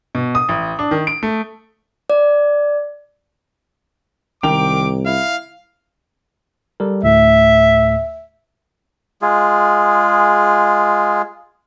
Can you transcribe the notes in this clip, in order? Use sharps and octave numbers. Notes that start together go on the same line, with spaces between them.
B2
D#6
A1
D4
D#3
D7
A3
D5
C2 D#3 G5 D6 F7
E4 F5
G3 A4 A#4
D2 A2 A3 E5
G#3 F4 G#4